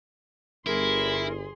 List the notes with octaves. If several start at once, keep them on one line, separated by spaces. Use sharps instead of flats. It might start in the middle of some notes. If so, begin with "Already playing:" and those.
G1 E4 G#4 A#4 C6